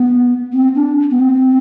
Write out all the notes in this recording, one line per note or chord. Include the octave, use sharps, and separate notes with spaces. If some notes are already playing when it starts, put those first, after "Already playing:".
Already playing: B3
C4
D4
B3
C4